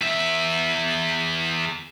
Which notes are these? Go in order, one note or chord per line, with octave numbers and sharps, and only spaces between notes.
E2 E5